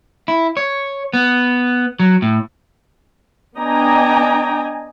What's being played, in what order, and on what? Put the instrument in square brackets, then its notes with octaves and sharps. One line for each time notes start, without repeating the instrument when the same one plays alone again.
[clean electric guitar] E4
C#5
B3
F#3
A2
[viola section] B3 D4 D#5 G5 G#5 A#5